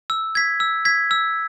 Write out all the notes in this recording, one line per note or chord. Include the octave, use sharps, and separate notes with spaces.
E6
G#6 B6
E6
G#6 B6
E6